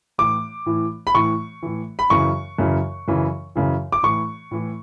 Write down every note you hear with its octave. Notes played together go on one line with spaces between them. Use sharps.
A2 E3 D6
A2 E3
B5
A2 E3 C#6
A2 E3
B5
F#2 C#3 E3 C#6
F#2 C#3 E3
F#2 C#3 E3
F#2 C#3 E3
D6
A2 E3 C#6
A2 E3